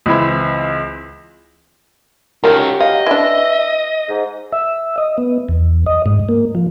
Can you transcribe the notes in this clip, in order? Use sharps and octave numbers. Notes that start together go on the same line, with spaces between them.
C#2 E3 C4 E4 B5
D#3 F3 F#3 C#4 F4 G4 A#4
D#5 F5
E3 D4 E5
G#2
E5
D#5
B3
E2
D#5
G#2
A#3
F3